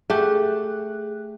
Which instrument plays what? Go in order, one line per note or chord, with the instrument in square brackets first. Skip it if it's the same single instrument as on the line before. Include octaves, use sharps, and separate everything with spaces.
[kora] A3 G4 [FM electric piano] G#4 F#6